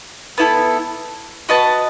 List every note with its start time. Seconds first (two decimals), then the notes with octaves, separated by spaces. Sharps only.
0.38 B3 E4 A4
1.49 F#4 B4 D#5 A5